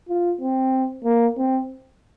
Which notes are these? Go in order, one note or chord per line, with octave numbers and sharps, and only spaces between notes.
F4
C4
A#3
C4